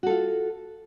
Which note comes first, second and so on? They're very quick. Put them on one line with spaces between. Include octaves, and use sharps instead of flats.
F#4 A4 F4